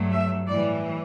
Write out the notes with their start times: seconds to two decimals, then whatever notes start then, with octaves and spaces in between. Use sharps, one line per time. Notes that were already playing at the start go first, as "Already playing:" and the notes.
Already playing: G2 F#3 A3
0.11 E5
0.47 A2 E3 G3 D5